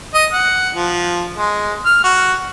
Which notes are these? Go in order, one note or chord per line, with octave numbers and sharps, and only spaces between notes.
D#5
F#5
F3
G#3
F6
F#4